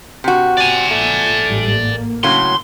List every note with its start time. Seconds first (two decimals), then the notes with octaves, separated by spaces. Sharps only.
0.24 C3 F#4
0.57 D5 G#5
0.91 A#1 A3
1.47 A1 G#2 G3
1.77 A#3
2.23 A2 C#3 F#3 C6